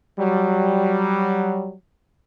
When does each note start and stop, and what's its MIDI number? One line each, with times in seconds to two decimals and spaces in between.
0.19 1.73 54
0.19 1.73 55